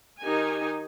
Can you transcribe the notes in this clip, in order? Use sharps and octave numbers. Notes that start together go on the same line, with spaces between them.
D#3 D#4 G4 G#5